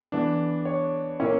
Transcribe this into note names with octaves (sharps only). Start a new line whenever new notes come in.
E3 B3 D4
C#5
A#2 A#3 C#4 E4 C#5